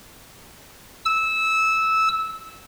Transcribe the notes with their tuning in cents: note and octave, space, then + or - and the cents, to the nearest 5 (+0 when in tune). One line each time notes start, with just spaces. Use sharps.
E6 -15